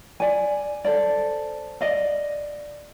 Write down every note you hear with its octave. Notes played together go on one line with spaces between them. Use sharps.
D5 G#5
A4 C5 D5
D5 D#5 F5